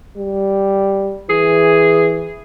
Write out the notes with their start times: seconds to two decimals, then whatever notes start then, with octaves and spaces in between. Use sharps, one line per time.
0.17 G3
1.30 E3 G#4